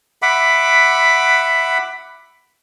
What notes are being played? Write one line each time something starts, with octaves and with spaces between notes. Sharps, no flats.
E5 F#5 B5 D6